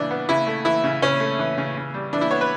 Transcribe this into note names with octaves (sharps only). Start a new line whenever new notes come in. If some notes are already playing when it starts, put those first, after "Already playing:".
Already playing: C#3 E3 G3 D4
B3
C#3 E4
A3
E3 E4
C#3
C#3 C#4
A3
E3
C#3
C#3
G3
E3 D4
E4
B3 C#5
B4